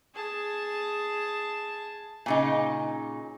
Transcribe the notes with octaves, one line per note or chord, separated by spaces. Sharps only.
G#4 A5
A#2 C#3 D#4